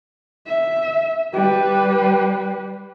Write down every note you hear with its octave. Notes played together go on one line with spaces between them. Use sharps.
E5
G3 B4